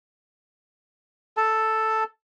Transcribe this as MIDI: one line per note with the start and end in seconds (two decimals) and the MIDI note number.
1.37 2.04 69
1.37 2.04 81